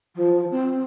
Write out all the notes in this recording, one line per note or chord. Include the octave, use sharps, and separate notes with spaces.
F3
C4